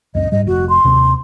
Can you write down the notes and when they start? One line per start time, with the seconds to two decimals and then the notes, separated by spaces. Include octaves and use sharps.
0.15 C#2 F#2 D#5
0.32 G#2 G3 D#5
0.47 F1 F#4
0.69 C6
0.84 D#2 C3 C4